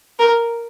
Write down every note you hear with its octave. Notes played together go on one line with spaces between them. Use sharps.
A#4